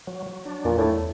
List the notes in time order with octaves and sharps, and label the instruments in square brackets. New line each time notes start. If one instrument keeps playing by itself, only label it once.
[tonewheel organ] F#3
F#3
D4
[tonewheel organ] E2 [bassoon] A#2
[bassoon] A2
[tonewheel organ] E2